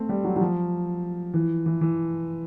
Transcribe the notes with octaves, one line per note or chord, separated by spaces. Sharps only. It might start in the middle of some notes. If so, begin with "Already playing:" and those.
Already playing: A3 C4
G3
F#3
F#3
F3
E3
E3
E3